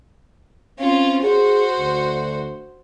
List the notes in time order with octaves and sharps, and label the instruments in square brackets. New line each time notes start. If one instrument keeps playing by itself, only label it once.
[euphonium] C4 [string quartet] C#4 F4
[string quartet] F#4 C5 [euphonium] G#4
[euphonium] D2